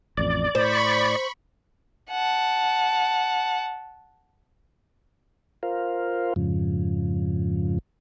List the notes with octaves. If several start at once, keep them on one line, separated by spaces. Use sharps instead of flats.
A1 F2 D5
A2 C5 B5 C#6
F#5 A5
F4 A#4 C5 F5
F2 G#2 C#3 F3